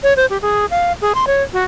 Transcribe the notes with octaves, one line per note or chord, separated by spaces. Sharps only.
C#5
C5
G4
G#4
F5
G#4
C6
C#5
F#4